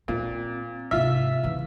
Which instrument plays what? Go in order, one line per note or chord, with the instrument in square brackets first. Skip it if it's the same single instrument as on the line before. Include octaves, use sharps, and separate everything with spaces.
[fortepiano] A#2 [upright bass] C4
[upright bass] G#2 C3 [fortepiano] F4 E5
[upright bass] C#3 E3